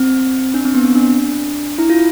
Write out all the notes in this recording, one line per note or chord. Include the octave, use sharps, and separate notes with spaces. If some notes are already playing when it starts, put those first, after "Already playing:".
Already playing: C4
D4
C4
B3
C4
D4
E4
F4